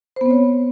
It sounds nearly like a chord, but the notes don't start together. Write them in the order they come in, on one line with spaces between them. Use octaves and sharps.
C5 B3 C4 C#5